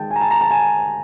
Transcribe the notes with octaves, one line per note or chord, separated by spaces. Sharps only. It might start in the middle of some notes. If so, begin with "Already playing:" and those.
Already playing: D#3 G#3 G5 A5
G#5
A#5
A5
A#5
A5
G#5